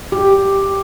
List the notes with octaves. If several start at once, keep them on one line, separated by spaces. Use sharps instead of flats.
G4